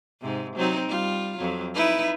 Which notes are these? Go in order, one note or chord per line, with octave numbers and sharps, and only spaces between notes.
G#2 C3
F#3 C4 D#4
G3 F4
F2 F#3
D#4 E4 B4